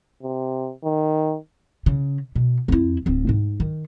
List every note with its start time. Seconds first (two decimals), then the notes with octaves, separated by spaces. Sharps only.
0.23 C3
0.84 D#3
1.86 C#3
2.36 B2
2.68 F2 E4
3.06 D1 C4
3.29 G#2
3.60 D#3